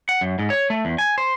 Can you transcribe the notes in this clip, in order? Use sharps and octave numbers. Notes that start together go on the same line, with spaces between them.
F#5
F#2
G#2
C#5
A3
E2
G#5
C5